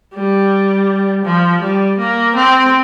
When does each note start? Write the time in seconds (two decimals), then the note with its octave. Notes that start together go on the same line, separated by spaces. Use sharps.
0.14 G3
1.24 F3
1.61 G3
1.98 A#3
2.35 C4